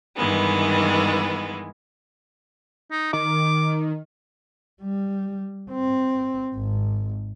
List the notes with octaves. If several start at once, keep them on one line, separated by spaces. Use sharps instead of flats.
G2 D#3 E3 G#3 B3
D#4
D#3 D6
G3
C4
G#1